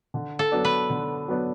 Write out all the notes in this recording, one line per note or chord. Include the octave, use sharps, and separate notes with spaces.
D3
A4
F#3 B3 D4
B4
D3
F#3 B3 D4